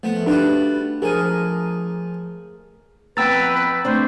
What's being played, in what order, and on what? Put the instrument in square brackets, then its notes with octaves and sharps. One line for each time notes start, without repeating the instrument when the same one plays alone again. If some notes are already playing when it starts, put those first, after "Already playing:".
[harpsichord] F3 B3 [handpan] A3
[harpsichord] G3 F4 F#4 [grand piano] D4 [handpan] B4
[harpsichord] F3 G#5 [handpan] G#4 A#4
[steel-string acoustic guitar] F2 B3 A#5 [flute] B4 [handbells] G5 E6 A6
[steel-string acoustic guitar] A3 C4 D4 [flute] C5